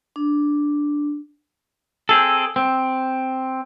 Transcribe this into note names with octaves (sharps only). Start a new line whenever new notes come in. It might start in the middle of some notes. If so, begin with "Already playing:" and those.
D4
C4 G#4 A4
C4